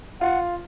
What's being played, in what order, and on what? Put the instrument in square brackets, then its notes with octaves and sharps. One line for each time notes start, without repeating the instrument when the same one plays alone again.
[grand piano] F4 [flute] F#5